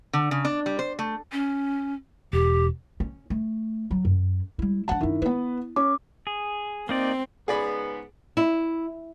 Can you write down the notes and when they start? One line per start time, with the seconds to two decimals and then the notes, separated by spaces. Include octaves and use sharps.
0.13 D3
0.31 C#3
0.45 D4
0.66 G3
0.79 C5
0.99 A3
1.31 C#4
2.33 E1 G4
3.00 C#4
3.30 A3
3.91 F#3
4.05 F#2
4.59 G3 E4
4.88 F3 D4 F#5 A5
5.01 F#2 D#3 D4 E4
5.22 B3 E4 B4
5.76 C#4 D6
6.27 G#4
6.89 A#3 C4 D#4 D5
7.48 G#2 C#3 B3 G#4 D5 B5
8.37 E4